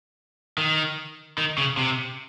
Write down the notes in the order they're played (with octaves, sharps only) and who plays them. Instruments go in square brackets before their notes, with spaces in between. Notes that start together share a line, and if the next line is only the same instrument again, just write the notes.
[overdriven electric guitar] D#3
D#3
C#3
C3